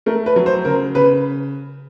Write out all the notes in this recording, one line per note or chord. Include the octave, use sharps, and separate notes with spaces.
A3 A#4
B4
F#3
C5
C#3 A#4
C#3 B4